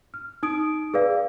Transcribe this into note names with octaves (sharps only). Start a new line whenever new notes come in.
F6
D#4 D#6 D7
G#4 B4 D5 F5